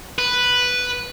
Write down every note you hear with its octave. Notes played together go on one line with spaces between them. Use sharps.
B4